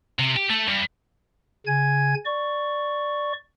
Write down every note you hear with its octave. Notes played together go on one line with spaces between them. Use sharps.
C3
G4
A3
G2
C#3 G#5 G#6
D5 C#6